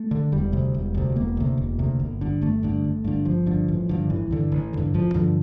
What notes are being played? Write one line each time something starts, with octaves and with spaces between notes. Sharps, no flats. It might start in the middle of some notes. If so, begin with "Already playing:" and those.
Already playing: A3
D3
E1 G3
D2 C3
E1
D2 C3
E1 A#3
D2 C3
E1
D2 C3
G1
G2 D3
G1 A3
G2 D3
G1
G2 D3
G1 F3
G2 D3
A1
G2 D3
A1 E3
G2 D3
A1
G2 D3
A1 F3
G2 D3 F3